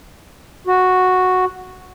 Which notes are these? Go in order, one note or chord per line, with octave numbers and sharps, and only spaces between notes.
F#4